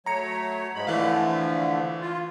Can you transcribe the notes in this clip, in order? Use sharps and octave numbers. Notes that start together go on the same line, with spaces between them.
F#3 A3 C#5 A#5 C#7
G#2 G#3 B5
D3 E3 F3 A3 F5
F4